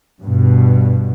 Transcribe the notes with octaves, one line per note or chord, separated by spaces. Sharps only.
G2 B2